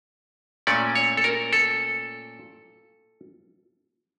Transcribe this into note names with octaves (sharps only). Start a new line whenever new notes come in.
A#2 A3 C#4 D5
C#5
A4
A#4
A4